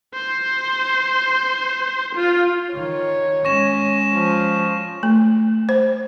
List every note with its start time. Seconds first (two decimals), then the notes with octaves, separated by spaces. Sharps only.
0.14 C5
2.16 F4
2.74 D#3 C#5
3.45 G#3 C#4 C#6 A#6 E7
4.14 F3
5.03 A3
5.69 C5